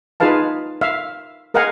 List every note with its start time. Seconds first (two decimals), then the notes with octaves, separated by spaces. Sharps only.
0.20 D#4 F4 G#4 B4 F5 A5
0.81 E5 F5
1.54 G#4 A#4 D#5 F5 F#5 G#5